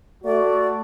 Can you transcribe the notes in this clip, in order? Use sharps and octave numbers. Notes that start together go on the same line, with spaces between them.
A3 F#4 D5